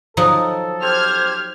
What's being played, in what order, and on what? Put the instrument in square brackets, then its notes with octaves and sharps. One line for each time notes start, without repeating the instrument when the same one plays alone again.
[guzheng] F3 F#3 D#4 [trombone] A4
[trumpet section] G4 C5 [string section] F6 G#6